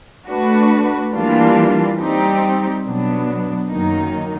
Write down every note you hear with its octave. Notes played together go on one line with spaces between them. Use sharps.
A3 D4 F#4 B4
E3 G3 A#3 D4 F4
G3 C4 D#4 G4
B2 F#3 B3 D4
F#2 D#3 F#3 A#3 D#4